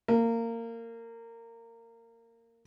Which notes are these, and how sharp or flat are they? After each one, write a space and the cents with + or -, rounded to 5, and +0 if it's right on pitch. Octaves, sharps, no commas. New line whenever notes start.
A#3 -20